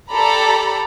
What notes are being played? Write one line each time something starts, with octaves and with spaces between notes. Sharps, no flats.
G4 A4 D5 A#5 B5